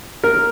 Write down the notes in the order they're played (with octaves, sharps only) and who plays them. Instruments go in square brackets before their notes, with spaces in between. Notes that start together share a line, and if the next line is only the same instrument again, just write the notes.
[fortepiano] A#4